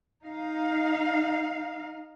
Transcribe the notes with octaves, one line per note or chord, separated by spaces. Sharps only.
D#4 F5